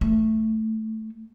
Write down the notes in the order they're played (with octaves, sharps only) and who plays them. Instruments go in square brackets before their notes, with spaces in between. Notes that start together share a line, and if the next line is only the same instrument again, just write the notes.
[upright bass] A3